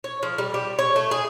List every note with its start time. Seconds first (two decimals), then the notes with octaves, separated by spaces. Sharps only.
0.04 C#5
0.23 F3
0.38 G3
0.54 G4
0.79 C#5
0.96 A3
1.11 G#4